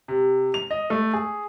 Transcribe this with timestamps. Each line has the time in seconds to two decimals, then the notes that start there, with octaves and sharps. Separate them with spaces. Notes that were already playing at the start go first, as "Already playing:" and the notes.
0.08 C3
0.54 F7
0.71 D#5
0.90 A3
1.13 G#4